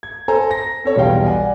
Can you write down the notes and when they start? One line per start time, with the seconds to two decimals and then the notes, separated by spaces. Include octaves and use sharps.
0.03 G#6
0.28 A4 C5 G#5 A#5
0.51 A#6
0.84 C4 A4 C#5
0.96 B1 E2 G3 F5 G5
1.26 D5 F#5 G#5